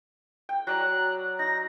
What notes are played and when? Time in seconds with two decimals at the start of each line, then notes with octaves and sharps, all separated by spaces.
0.49 G5
0.67 F#3 D5 A#5 F#6
1.39 D#4 A#6